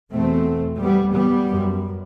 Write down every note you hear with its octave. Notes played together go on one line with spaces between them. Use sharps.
E2 B2 A3 C4
G3 B3
G3 B3
F#2